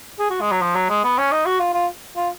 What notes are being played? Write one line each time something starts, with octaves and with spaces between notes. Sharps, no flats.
G#4
F#4
G#3
F#3
F3
F#3
G#3
B3
C#4
D#4
F#4
F4
F4
F4